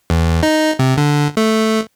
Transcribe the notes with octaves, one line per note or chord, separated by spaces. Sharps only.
E2
D#4
C3
D3
A3